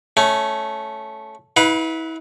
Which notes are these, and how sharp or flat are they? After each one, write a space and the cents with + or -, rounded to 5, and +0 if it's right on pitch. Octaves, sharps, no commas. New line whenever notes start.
A3 -10 C#4 +0
E4 -35 B4 +0 F5 +45